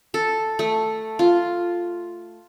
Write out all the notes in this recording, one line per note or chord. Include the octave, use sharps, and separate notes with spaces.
A4
A3
F4